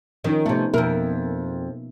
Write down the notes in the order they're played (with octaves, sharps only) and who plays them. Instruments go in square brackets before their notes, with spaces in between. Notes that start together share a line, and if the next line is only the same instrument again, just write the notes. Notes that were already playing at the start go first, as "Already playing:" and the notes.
[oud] D#3 [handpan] F3 C#4 D#4
[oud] C3 A3 [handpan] B3
[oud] F2 A#4 [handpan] B2 A#3 E5